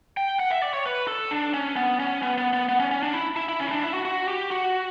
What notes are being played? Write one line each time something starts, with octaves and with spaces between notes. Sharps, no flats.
G5
F#5
E5
D5
C#5
B4
A4
D4
C#4
B3
C#4
B3
B3
B3
B3
C#4
C#4
D4
E4
E4
E4
C#4
E4
D4
E4
F#4
F#4
G4
F#4